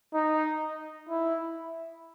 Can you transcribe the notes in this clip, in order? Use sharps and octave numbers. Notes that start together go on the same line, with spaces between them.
D#4
E4